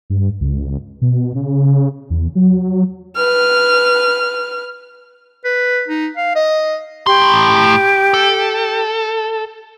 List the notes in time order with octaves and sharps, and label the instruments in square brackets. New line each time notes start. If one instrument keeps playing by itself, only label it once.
[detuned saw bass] G2
C#2
B2
C#3
E2
F#3
[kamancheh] B4 F6
[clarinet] B4
D#4
F5
D#5
[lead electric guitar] A2 C6 [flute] G4
[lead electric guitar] A4